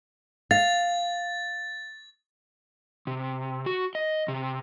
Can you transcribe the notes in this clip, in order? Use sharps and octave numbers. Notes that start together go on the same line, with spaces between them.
F5 A6
C3
F#4
D#5
C3